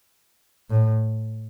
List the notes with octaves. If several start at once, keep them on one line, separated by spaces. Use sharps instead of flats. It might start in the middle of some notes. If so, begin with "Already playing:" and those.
A2